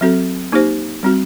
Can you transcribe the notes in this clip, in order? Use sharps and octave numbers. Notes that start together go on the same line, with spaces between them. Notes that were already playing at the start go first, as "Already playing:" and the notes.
F#3 C4 F#4 A4
A#3 D#4 G4 C5
G3 C4 F#4